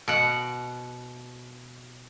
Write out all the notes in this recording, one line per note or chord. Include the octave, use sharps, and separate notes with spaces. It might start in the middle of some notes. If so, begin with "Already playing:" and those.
B2 F#5